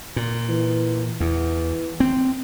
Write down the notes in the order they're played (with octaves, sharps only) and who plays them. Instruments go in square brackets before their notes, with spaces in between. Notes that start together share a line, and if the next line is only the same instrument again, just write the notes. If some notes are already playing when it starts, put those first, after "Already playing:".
[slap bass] A#2
[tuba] E3
[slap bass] E2 [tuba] E3
[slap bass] C4